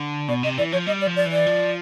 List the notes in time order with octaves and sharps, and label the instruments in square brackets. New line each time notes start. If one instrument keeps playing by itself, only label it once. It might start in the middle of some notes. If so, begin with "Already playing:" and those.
Already playing: [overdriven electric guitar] D3
[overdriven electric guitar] B2 [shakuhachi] D5
[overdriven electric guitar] C3 [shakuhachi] D#5
[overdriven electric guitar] E3 [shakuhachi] D5
[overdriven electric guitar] F3 [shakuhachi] C#5
[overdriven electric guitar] G3 [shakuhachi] D#5
[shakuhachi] D5
[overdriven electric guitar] F3
[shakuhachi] D5
[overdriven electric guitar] E3
[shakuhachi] D5
[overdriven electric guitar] F3